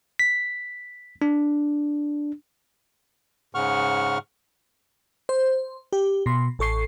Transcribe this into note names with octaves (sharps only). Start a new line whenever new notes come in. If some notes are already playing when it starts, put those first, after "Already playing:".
B6
D4
G#2 C#3 F#5 C#6 F6
C5
G4
B2 C6
A1 A4 C#6 C7